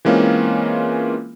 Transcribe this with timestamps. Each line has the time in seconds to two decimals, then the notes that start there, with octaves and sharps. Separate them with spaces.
0.05 E3 G#3 A#3 C4 C#4 F4